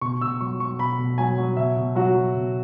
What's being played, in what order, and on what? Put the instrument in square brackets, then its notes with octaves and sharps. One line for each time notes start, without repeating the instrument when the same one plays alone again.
[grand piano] B2 C#6
B2 E6
F#3 C#6
F#3 C#6
B2 B5
B2
F#3 G#5
F#3
B2 E5
B2
F#3 F#4
F#3
B2